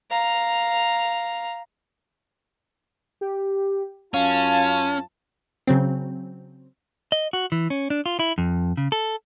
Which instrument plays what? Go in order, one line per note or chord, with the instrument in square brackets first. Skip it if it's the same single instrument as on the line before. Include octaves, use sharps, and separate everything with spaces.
[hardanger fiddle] F5 A#5
[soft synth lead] G4
[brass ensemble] F#2 F4 A5 [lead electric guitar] C#4 [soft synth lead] F5
[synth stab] C#3 F#3 C4
[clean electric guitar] D#5
F#4
E3
C#4
D4
F4
E4
F2
C#3
A4